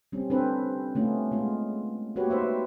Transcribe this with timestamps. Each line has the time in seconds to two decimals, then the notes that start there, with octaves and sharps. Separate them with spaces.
0.12 G3 C4 C#4
0.30 C4 D4 A4 B4
0.95 A3 B3 C#4 F4
1.31 G#3 B3 F4
2.16 A#3 F#4 G4 B4 C#5
2.30 D#4 B4 C5 E5